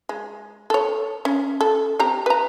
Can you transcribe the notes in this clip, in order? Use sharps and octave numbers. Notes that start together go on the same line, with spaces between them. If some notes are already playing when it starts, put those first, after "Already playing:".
G#3
A4 C#5
C#4
A4
C4 G4 A#5
B4 A#5